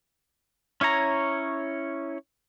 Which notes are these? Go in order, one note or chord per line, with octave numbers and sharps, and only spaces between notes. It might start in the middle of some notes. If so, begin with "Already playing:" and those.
C#4 E4 C#5 A#5